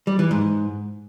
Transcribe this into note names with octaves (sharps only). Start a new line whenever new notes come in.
G3
E3
G#2